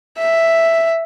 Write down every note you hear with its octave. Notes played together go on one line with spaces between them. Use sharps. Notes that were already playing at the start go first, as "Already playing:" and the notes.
E5